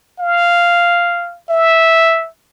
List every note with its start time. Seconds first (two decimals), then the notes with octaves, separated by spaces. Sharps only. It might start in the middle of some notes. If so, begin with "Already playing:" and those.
0.20 F5
1.50 E5